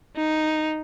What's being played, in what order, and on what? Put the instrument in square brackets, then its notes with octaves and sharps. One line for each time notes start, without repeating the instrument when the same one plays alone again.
[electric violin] D#4